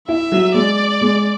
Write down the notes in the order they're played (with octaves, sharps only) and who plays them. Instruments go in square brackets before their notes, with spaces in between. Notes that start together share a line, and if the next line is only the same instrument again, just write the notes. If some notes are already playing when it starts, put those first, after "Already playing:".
[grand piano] E4 [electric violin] E5
[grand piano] F#3
[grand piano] G#3 [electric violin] D5
[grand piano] G#3